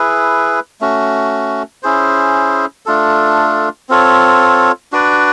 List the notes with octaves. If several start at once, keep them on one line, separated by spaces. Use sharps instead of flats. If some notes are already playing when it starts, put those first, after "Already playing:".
Already playing: E4 G#4 B4
A3 C#4 F#4
C#4 E4 G#4 C5
A3 D4 F4 A4
C4 F4 A4 C#5
D4 F#4 B4 D5